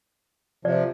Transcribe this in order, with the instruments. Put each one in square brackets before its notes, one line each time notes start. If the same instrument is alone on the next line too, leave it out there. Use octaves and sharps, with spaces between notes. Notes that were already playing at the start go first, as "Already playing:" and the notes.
[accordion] C3 F3 [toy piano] D5